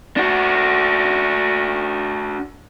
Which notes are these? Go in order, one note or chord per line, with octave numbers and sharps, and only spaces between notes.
D4 F#4